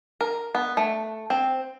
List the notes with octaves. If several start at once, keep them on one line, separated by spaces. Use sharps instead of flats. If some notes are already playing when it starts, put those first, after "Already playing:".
A#4
B3
A3
C4